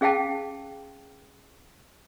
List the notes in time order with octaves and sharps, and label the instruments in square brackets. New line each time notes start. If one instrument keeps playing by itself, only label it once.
[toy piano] C#4 G#4 F5 G5 A5